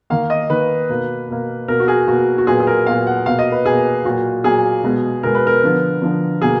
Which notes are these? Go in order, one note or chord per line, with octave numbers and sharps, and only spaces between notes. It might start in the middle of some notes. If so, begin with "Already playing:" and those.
D#3 A#3 F5
D#5
D#3 A#3 B4
B2 A#3
B2 A#3
B2 A#3 A#4
F#4
G#4
B2 A#3 F#4
F#4
A#2 F#3 B3 G#4
G#4
A#4
A#2 F#3 B3 F5
F#5
B2 A#3 F5
D#5
B4
B2 A#3 G#4
A#2 F#3 A#3 F#4
A#2 F#3 A#3 G#4
B2 G#3 B3
B2 G#3 B3 A#4
B4
A#4
D3 F3 B3
D3 F3 B3
B2 A#3 G#4